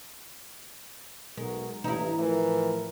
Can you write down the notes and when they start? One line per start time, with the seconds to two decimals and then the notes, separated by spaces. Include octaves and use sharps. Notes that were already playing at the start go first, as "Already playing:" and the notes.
1.37 B1 G#3 F#4 A#4
1.84 A1 G2 E3 D#4 E4 A#5
2.18 A2 E3 F3 A#4